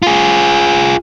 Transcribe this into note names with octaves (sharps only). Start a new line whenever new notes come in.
F4 G#4